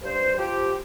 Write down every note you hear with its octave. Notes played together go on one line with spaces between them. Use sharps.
G2 C5
F3 G4